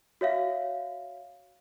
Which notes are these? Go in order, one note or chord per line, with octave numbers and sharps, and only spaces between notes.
F#4 C#5 E5 F5